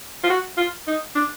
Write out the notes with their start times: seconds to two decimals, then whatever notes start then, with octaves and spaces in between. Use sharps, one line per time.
0.23 F4
0.30 F#4
0.57 F4
0.87 D#4
1.15 D4